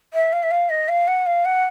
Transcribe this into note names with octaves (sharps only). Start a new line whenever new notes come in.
E5
F5
E5
F5
D#5
F5
F#5
F5
F#5